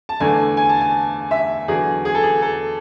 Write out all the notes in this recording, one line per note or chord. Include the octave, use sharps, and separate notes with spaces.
A5
E2 D3 A3 G#5
G#5
A5
G#5
E5
E2 D3 F#3 G#4
G#4
A4
G#4
A4